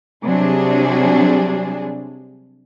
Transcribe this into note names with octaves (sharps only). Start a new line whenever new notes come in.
C3 F#3 G3 D4 G#4